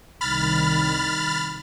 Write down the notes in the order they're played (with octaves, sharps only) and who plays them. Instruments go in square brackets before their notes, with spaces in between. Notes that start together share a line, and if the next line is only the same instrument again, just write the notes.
[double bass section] C2 D#3 [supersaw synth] B5 F6 A6